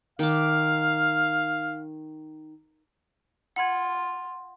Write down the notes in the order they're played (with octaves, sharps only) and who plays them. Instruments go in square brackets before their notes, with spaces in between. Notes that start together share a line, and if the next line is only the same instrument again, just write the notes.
[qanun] D#3 D6 [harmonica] F5
[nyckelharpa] F4 [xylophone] F#5 B5 G#6